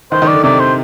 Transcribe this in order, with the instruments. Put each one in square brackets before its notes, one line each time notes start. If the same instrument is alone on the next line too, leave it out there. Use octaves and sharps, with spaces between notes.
[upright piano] D#3 [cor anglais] C5
[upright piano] D#3
[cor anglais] D5
[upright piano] D3
[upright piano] C3 [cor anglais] D5
[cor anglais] C5